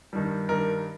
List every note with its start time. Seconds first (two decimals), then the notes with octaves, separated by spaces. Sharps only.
0.13 G2 D#3 G3
0.48 G2 D#3 G3 A#4